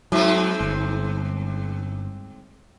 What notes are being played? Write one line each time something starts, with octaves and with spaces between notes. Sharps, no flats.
G#2 F#3 C4
G1